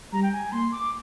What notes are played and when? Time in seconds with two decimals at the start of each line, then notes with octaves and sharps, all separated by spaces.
0.12 G3 A#5
0.23 G5
0.32 G#5
0.52 A#3 C6
0.72 D6